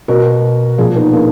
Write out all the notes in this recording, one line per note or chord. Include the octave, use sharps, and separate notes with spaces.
B2 F#4 A#4
A#2 F3 F4 G#4
B3 D#4
A#3 D4